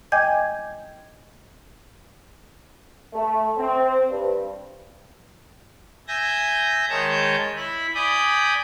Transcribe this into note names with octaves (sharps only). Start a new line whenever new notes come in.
D#5 G5 G#5 D6 G6 G#6
A3
C4
G2
E5 G#5 G6 A#6
D#3 G#3 C#5 A5 G6
E4 B5
D5 G#5 B5 D#6 G6